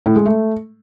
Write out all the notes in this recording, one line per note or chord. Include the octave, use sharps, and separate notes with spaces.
A2
G#3
A3